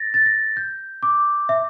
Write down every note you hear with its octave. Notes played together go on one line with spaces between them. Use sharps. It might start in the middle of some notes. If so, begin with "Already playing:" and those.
Already playing: A6 A#6
A6
A#6
G6
D6
E5